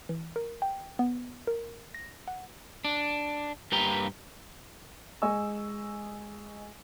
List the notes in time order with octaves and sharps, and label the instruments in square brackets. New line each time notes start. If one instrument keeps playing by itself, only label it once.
[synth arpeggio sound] E3
A#4
G5
B3
A#4
A#6
F#5
[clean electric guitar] D4
G2 A#3 G4 B4 G5 A#5
[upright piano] G#3 D#5 G#5 C#6 E6